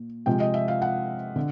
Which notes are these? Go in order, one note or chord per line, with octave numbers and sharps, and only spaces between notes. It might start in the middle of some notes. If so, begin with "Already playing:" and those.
Already playing: A#2
C3 F3 G#3 G5
D#5
E5
F5
F#5
D3